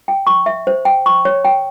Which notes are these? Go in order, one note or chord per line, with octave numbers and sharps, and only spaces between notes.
G5
C#6
E5
C5
G5
C#6
C#5
G5